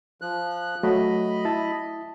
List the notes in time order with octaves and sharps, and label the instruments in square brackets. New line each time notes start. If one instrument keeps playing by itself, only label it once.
[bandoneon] F3 F#6
[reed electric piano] F#3 A3 F#4 [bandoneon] D#5 B5
[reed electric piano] E4 A5